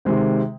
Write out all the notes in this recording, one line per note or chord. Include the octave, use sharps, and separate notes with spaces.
C3 D#3 G#3 C4